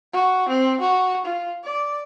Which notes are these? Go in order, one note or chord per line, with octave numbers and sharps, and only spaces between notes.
F#4
C4
F#4
F4
D5